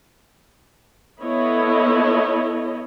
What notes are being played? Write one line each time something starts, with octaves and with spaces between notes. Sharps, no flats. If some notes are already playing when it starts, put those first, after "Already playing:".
B3 E4 A4 C#5 D#5